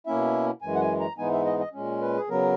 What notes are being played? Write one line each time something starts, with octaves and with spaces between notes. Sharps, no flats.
B2 A#3 C#4 E4 E5
F#2 E3 G#3 G#5
F#5
G#5
A#5
G#2 E3 G#3 B3 D#4 G#5
E5
D#5
D#5
A#2 G#3 C#4
B4
G#4
C#3 F#3 B3 A#4